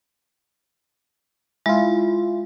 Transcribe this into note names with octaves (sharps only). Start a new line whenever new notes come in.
G#3 E4 F4